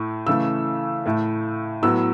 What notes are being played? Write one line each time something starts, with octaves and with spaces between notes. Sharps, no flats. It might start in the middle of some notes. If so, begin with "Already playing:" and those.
Already playing: A2 A3
C#3 E3 A3 E6
A2 A3
A2 F#3 B3 E6